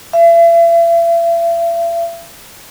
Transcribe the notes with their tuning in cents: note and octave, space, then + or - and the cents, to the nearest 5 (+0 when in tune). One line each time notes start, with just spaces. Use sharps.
E5 +40